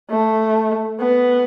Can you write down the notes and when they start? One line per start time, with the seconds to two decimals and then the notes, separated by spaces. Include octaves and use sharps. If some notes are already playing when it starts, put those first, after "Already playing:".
0.10 A3
1.00 B3